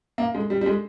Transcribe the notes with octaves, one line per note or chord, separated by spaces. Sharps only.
A#3
G#3
G3
G3
G#3